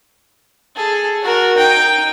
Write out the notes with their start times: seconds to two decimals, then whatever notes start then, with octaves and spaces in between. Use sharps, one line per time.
0.76 G#4 A4
1.23 F#4 A#4
1.57 D#4 G5